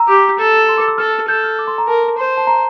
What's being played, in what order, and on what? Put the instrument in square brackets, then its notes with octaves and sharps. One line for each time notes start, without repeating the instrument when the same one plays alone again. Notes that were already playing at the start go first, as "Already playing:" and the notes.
Already playing: [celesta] A#5 E6
[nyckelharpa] G4
A4
[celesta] C6
D6
E6
[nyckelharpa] A4 [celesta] F6
[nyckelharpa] A4 [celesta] G6
[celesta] F6
D6
C6
A#5
[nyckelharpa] A#4 [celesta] A5
[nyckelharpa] C5
[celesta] A5
A#5